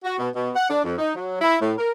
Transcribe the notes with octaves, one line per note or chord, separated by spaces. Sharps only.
F#4
B2
B2
F#5
D4
F2
D#4
F#3
E4
A2
A#4